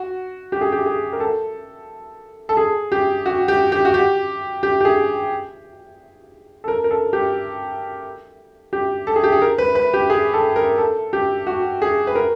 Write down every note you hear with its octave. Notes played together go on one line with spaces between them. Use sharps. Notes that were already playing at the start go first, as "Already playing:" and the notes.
Already playing: F#4
G4
G#4
G4
G#4
A#4
A4
A4
G#4
G4
F#4
G4
G4
F#4
G4
G4
G4
G#4
A4
A#4
A#4
A4
G4
G4
A4
G#4
G4
G#4
A#4
B4
B4
G4
G#4
A4
A#4
A4
G4
F#4
G#4
B4
A#4